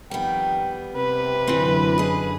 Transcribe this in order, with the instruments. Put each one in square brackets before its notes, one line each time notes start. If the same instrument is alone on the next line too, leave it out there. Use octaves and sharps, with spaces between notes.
[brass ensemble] F2 D#3 G5 [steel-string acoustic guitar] G3 B3
[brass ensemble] C3 [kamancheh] B4
[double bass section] F#2 D3 [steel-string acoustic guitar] E3 C4
[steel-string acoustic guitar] G#4 D#5